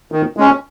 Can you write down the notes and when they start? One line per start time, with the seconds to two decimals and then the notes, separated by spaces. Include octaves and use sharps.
0.12 D#3
0.37 G#3 C#4